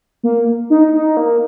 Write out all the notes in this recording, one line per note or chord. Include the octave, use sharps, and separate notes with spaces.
A#3
D#4
D#4
A#3